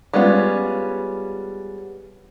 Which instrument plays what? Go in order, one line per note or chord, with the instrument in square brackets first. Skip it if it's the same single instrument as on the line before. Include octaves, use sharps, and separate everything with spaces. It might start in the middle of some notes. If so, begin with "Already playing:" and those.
[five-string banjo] G3 G#3 B3 C#4 F4